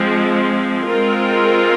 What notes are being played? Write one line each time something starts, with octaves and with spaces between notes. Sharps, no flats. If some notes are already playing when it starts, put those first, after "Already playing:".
Already playing: F3 G#3 C4
G#3 C4 F4 A#4